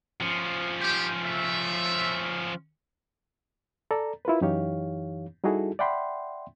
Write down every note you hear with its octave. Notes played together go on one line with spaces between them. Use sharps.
F3 C#4
G4
A3 E5
A4 D5 A#5
E4 F4 A#4 B4
F#2 E3 D#4 G4 C#5 F5
G3 D#4 E4 F#4 G#4 A4
D5 E5 F#5 G5 B5 C6